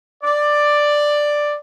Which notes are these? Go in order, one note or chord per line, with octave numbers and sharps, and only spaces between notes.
D5